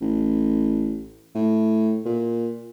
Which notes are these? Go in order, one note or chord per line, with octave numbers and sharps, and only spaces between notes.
A1
A2
A#2